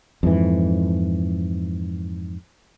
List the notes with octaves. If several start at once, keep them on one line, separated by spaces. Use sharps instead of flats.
F2 G#2 E3